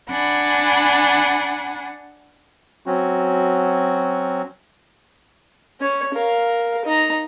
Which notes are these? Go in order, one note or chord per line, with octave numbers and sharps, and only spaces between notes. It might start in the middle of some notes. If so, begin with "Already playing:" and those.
D4 F#5 G#5 B5
F#3 C4 C#4 F#4
C#4 C#5
A#4 F5
D#4 A#5